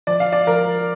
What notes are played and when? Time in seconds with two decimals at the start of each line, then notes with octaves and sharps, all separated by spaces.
0.07 F3 D5
0.20 F5
0.33 D5
0.47 F3 A#4